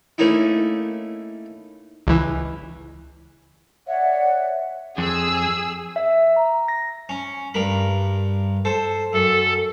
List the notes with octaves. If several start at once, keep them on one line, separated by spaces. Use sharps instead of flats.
A3 A#3 C#4 D#4 E4
C#2 E3
C#5 D5 E5 F#5
F2 G#4 E6
E5
A#5
A#6
C#4
G2 A#4 B5
A4 C5
F#2 A4